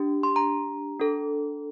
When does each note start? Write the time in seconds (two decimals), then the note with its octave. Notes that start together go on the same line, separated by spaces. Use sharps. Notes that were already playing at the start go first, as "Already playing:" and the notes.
Already playing: D4 G4
0.23 C6
0.36 A#5
1.00 D4 A4